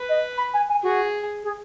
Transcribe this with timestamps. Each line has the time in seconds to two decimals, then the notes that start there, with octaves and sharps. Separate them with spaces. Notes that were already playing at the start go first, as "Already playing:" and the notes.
Already playing: B4
0.09 D#5
0.38 B5
0.53 G#5
0.69 G#5
0.83 F#4 G#4
1.43 G#4